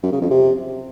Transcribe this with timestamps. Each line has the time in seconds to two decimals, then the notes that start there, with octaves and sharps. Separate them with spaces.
0.03 F#2
0.12 C#3
0.21 F2
0.30 C3